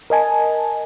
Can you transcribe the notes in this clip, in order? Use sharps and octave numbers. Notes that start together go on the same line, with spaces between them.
A#4 D#5 G#5 A5